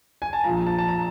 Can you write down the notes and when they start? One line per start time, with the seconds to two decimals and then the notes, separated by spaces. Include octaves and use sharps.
0.22 G#5
0.33 A5
0.44 A#1 A#2 F3 A#5
0.67 A5
0.78 A5
0.88 A#5